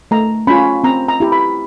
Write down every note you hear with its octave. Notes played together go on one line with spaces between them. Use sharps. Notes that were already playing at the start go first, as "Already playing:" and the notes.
A3 A#5
C#4 F4 B5
C4 A#5
A#5
E4 G4
B5